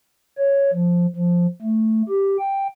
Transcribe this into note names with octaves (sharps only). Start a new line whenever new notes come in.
C#5
F3
F3
A3
G4
G5